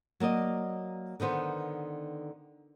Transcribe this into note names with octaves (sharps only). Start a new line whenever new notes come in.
F#3 A#3 D5 D#5
D3 D#3 B3 C5